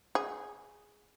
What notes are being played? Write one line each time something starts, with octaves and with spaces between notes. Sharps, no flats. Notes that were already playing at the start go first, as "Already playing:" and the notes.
G#4